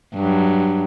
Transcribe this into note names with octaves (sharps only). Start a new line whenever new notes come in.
G2 F#3